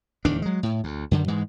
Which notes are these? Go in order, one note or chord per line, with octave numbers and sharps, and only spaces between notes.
D1 E2 D#3 D4
F#3 G#3
A2
D2
F#2 D3 D#3
G#2 E3 G#3